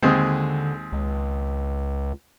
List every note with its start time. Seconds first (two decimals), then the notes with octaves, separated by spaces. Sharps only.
0.03 D#2 D3 G#3 C4
0.92 C#2